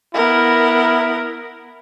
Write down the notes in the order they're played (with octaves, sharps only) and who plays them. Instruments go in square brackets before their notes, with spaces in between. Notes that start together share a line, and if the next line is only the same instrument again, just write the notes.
[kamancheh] B3 A#4 [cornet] E4